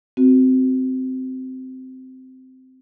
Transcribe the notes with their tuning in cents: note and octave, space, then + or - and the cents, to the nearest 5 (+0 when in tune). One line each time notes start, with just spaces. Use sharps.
C4 -15 F#4 +0